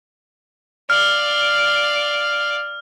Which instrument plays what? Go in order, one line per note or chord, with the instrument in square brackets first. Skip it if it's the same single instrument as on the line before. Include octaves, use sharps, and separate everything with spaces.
[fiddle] D5 F5 [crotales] F6